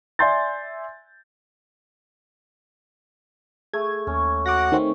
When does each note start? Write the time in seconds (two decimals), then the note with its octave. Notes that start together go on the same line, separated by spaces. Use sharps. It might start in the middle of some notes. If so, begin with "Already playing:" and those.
0.19 D5 E5 G#5 C6 G6 A6
3.74 A3 G#4 G#6
4.07 D#2 C#4
4.46 F#4 F#5 D6 A#6
4.72 D#3 A3 C4